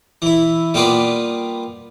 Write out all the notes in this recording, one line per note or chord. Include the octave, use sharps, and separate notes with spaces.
E3 E4
G3 A#3 B3 F4 B4 D5